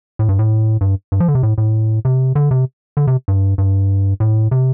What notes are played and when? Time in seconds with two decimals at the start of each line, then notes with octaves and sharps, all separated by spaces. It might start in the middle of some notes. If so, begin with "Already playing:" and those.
0.19 A2
0.29 G2
0.39 A2
0.81 G2
1.12 G2
1.20 F3
1.28 D3
1.35 C3
1.43 A2
1.58 A2
2.05 C3
2.35 D3
2.51 C3
2.97 D3
3.07 C3
3.28 G2
3.58 G2
4.20 A2
4.51 C3